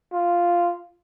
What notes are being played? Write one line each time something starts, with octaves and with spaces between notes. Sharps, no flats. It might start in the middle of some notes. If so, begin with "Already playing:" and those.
F4